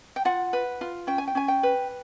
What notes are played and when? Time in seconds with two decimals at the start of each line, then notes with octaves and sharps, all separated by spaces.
0.16 G5
0.25 F4 F#5
0.53 B4
0.81 F4
1.07 C#4 G5
1.18 G#5
1.28 G5
1.35 C#4 G#5
1.48 G5
1.63 B4